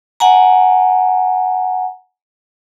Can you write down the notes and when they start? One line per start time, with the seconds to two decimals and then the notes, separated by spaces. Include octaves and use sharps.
0.20 F#5 G#5 A#5